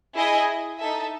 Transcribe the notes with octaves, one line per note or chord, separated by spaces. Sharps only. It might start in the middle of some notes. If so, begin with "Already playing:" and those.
E4 G#4 D#5 G#5
D#4 A4 E5